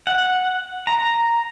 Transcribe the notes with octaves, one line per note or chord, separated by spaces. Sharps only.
F#5
A#5